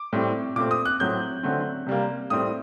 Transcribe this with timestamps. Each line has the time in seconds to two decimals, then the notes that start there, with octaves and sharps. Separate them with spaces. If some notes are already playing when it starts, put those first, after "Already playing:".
Already playing: D6
0.13 A2 G3 C4
0.56 A#2 A3 C4 D6
0.71 D#6
0.85 F#6
1.00 A2 F#3 C4 G6
1.43 D3 F#3 A3 C4
1.86 C3 G3 A#3
2.30 A2 G3 C4 D#6